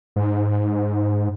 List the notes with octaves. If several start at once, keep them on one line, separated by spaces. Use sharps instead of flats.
G#2